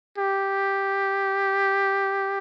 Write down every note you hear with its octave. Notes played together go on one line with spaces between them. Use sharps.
G4